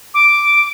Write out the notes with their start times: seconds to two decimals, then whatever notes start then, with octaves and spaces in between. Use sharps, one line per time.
0.14 D6